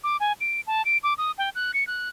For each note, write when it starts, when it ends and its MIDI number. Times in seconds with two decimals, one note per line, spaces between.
0.03 0.17 86
0.20 0.32 80
0.40 0.61 98
0.67 0.84 81
0.85 0.98 98
1.03 1.14 86
1.18 1.31 87
1.38 1.49 79
1.55 1.72 90
1.74 1.86 97
1.87 2.09 90